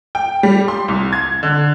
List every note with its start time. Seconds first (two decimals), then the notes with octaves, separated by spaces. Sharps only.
0.15 G5
0.43 G3
0.68 C6
0.88 C2
1.13 G#6
1.43 D3